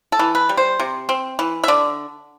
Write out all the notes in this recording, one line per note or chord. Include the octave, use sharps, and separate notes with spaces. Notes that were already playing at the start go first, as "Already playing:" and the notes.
A4
E3
B4
G3
C5
C3
C4
E3
E5
D3 D5